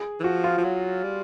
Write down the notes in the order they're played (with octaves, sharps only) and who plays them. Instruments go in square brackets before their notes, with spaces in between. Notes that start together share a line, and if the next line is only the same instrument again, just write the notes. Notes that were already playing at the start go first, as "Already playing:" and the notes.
Already playing: [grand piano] G#4
[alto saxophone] E3
[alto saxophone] F3 [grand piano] F#4
[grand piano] F4
[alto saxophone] F3
F#3
G3